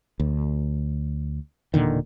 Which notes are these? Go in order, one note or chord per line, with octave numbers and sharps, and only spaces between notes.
D2
E1 A#2 D3 D#3